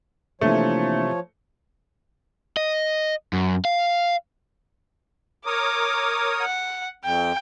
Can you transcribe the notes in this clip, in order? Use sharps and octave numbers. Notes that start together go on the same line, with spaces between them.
C3 E3 F3 A3 A#3 D4 E4 C#5
D#5
F#2
F5
A#4 C#5 D6 D#6
F#5
F2 G5